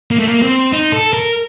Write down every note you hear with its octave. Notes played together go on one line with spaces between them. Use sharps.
A#3
A3
A#3
C4
D#4
A4
A#4